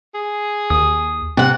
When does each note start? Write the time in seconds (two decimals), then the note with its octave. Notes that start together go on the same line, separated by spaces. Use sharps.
0.14 G#4
0.70 D#2 D#6
1.37 C3 C4 F#5